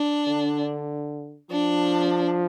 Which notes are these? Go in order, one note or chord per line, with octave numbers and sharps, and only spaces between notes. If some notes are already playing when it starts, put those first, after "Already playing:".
Already playing: D4
D3
F3 D4